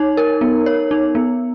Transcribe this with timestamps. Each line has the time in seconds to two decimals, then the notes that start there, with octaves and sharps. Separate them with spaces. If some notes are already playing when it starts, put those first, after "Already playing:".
Already playing: D#4 C#5
0.17 A#4
0.41 B3
0.66 C#5
0.91 D#4
1.15 B3